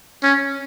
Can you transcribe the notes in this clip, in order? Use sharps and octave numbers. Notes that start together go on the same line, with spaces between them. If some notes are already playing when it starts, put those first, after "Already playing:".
C#4